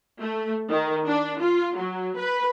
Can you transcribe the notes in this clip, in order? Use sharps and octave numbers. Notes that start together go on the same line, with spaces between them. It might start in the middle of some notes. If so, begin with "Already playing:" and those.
A3
D#3
D4
F4
F#3
B4